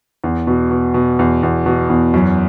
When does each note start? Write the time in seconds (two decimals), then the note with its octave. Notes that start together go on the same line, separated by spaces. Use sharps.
0.24 E2
0.47 B2
0.71 B2
0.94 B2
1.19 E2
1.43 E2
1.66 B2
1.90 E2
2.14 F#2